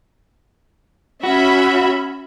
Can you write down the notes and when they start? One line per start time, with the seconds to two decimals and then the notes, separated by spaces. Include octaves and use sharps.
1.23 C#4 F#4 E5 B5